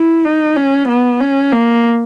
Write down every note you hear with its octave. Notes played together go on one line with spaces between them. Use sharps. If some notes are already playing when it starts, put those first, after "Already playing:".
Already playing: E4
D#4
C#4
B3
C#4
A#3